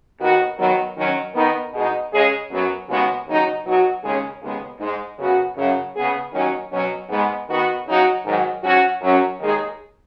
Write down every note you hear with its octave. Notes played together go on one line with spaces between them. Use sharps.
D#2 D#3 B3 F#4
D#3 F#3 B3
D#3 F#3 C#4
D#3 B3 D#4
B2 G#3 D#4
C#3 G#3 C#4 G#4
F#2 F#3 B3
D#2 C#3 G#3 B3 F#4
D#2 C#3 F#3 D#4
B2 F#3 D#4 F#4
D#2 C#3 G#3 C#4 G#4
D#2 C#3 G#3 B3 G#4
G#2 G#3 D#4
F#2 C#3 B3 F#4
F#2 C#3 F#3
C#3 B3 G#4
D#2 D#3 F#3 C#4
B2 F#3 C#4
G#2 G#3 B3
D#3 B3 F#4
C#3 F#3 D#4 F#4
G#2 D#3 F#3
G#2 F#3 C#4 F#4
F#2 F#3 C#4
D#2 D#3 G#3 D#4 G#4